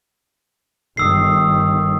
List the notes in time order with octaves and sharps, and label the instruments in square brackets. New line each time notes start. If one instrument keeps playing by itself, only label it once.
[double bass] G1 D#3 [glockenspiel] D#6 E6 C7